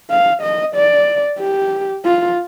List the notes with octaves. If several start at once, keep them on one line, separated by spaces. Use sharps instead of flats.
F5
D#5
D5
G4
F4